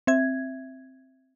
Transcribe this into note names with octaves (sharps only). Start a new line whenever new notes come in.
C4 E5 G#6